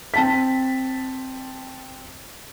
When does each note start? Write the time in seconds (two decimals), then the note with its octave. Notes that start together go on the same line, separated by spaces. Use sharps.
0.14 C4 A5 B6